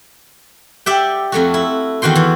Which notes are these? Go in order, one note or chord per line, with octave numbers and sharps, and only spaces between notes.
G4 D5 E5 F#5 G5
F2 A3 F#4
E4
E2 D#3 F#4 G5 C6
E3